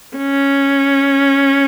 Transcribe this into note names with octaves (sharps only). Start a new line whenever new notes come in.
C#4